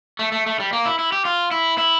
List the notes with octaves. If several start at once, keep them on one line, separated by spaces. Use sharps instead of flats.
A3
A3
A3
G3
A#3
E4
E4
G4
F4
E4
E4